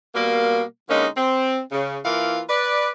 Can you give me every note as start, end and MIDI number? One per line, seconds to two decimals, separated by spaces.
0.15 0.63 47
0.15 0.63 55
0.15 0.63 58
0.89 1.07 50
0.89 1.07 56
0.89 1.07 58
0.89 1.07 61
0.89 1.07 63
1.17 1.60 60
1.72 1.98 49
2.04 2.41 52
2.04 2.41 58
2.04 2.41 64
2.04 2.41 65
2.04 2.41 77
2.49 2.89 71
2.49 2.89 74